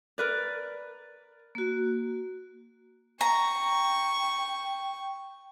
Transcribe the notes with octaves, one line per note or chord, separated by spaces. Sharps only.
A#4 B4 D5
A#3 F#4
G5 A#5 C#6